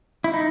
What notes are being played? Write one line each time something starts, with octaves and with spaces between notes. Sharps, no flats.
E4
D#4